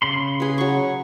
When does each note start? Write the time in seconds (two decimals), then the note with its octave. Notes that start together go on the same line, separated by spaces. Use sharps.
0.02 C#3 B5 C6
0.40 G#4 B4
0.58 F#3 C#6